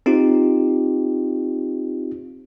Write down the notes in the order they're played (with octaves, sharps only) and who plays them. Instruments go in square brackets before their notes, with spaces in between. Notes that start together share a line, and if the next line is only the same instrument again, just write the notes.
[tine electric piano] C4 D#4 F4 G4